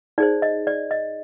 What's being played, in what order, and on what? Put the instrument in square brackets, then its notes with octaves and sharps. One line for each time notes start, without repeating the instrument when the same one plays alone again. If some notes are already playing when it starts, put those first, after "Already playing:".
[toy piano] D#4 G#4 C5 D5
D#5
D5
D#5